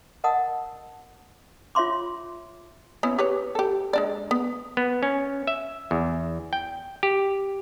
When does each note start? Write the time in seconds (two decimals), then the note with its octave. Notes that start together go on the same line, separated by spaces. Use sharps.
0.24 A#4 D#5 F#5 A5 D#6
1.75 F4 C#5 E5 C6 D6
3.03 B3 C#4 E4
3.18 G4 B4 C#5
3.55 G4 A4
3.93 G#3 D4 D5
4.31 B3
4.77 B3
5.03 C#4
5.47 E5
5.91 E2
6.53 G5
7.03 G4